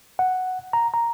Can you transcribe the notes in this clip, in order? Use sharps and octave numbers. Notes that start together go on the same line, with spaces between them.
F#5
A#5
A#5